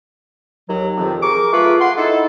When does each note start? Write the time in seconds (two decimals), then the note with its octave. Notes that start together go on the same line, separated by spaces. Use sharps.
0.69 D#2 F#3
0.98 F2 C3 D#3 F3
1.22 G#4 A#4 C#6 D6
1.53 A3 F4 G#4 B4
1.81 F#5 C6
1.98 D#4 E4 A4